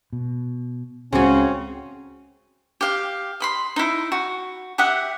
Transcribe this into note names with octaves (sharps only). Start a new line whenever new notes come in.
B2
C#2 C#3 G#3 C4 C#4 F#4 G#4
G4 F5
D#5 B5 C6
D#4 E4
F#4
G4 E5 F#5 D#6